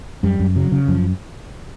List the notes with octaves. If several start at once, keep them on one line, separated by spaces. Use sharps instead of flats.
F#2 G3
F#2
C#3 F#3
C#3
F#2 F3